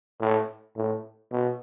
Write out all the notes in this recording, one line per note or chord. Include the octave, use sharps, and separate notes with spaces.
A2
A2
B2